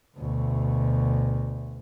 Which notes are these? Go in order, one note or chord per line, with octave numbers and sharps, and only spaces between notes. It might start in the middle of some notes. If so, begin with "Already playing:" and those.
D2 B2